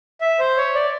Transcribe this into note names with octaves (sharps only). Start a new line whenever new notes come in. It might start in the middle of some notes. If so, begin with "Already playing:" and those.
E5
C5
C#5
D5